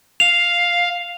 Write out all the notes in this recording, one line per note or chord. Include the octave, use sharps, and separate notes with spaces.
F5 F7